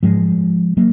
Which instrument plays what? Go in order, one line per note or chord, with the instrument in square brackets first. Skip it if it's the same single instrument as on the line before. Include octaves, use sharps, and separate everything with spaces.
[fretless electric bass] G#2 F3 G#3
F#3 A#3